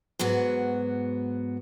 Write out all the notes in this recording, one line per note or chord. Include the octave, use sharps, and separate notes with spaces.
G#2 F#3 B3 F#4